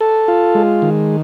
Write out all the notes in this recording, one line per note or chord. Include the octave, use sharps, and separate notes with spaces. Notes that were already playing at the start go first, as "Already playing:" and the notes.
A4
F4
G#3
D#3